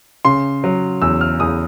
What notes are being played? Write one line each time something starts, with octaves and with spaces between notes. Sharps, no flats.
C#3 C6
F#3
E2 E6
F6
E2 D#6